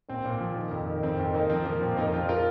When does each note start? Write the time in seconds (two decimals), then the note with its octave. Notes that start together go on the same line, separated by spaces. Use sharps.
0.09 A#2 C4
0.25 A#2
0.40 F3
0.56 D#3
0.71 F2
0.88 D#3
1.03 F2 C4
1.19 F2 C4
1.34 F2 A#3 D#4
1.50 F3 C4
1.65 F3 A#3
1.81 A#2 C4
1.97 F2 A#3 D#4
2.13 F3 C4 F4
2.29 F4 A#4